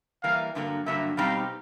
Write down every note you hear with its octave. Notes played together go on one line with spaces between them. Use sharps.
E3 G3 A#3 F5
G2 D3 F#3 A#3
G2 D3 F#3 A#3 E5
B2 G3 C4 D#4 G4 F5